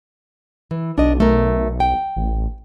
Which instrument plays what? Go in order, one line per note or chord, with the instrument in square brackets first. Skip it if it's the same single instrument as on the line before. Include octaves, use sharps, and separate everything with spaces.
[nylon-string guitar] E3
[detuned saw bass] B1 [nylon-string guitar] D4 D#5
[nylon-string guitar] A3 A#4
G5
[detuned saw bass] A1